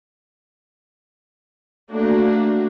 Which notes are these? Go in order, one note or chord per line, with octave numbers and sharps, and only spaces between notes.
A3 A#3 D4 F#4